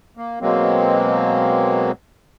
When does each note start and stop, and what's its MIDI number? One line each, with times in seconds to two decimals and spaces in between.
0.17 0.39 58
0.41 1.92 47
0.41 1.92 54
0.41 1.92 56
0.41 1.92 58
0.41 1.92 60